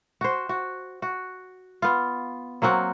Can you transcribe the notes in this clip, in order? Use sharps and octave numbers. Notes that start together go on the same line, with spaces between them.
F#4 C5
F#4
F#4
B3 F4
F#3 A#3 C4 F#4